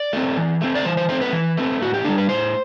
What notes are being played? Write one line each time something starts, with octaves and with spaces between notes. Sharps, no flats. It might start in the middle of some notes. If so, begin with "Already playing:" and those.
Already playing: D5
A3 C4
E3
A3 C4
D5
E3 C5
C5
A3 C4 C5
B4
E3
A3 C4
A2 F#4
G4
G3 D4 A4
B4
A2 C5